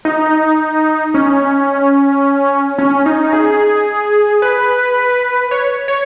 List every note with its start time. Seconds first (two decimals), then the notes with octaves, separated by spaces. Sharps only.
0.05 D#4
1.14 C#4
2.78 C#4
3.06 D#4
3.33 G#4
4.42 B4
5.51 C#5
5.88 C#5